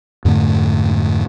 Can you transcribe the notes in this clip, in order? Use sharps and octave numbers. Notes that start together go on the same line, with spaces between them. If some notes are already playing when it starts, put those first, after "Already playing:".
F2 G#2 D3 A3